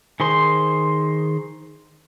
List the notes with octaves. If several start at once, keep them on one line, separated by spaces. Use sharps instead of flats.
D#3 G#4 C5 C6